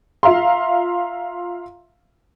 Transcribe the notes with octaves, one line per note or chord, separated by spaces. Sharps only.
F4 E5 F5 A#5 C6